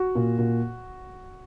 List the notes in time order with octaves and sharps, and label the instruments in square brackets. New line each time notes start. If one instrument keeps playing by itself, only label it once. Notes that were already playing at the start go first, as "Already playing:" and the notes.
Already playing: [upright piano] F#4
A#2
A#2